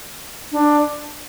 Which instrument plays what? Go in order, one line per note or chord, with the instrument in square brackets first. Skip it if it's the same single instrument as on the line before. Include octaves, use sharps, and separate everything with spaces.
[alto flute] D4